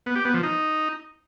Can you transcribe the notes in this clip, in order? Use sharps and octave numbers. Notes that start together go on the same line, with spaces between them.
B3
G4
B3
F3
D#4